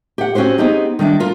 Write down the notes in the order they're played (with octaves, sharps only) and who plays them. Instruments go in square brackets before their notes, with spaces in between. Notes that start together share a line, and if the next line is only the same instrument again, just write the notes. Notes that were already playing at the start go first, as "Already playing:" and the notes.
[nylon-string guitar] G4 F#5
C4 C#4 F#4 G4 C5
B3 C4 D#4 G4 G#4
D#3 G3 D4 E4
F4 A#4